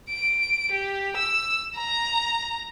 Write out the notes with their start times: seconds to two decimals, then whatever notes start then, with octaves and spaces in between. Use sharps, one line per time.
0.11 D7
0.71 G4
1.17 E6
1.77 A#5